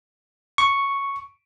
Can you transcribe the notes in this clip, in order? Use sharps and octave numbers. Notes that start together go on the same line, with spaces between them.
C#6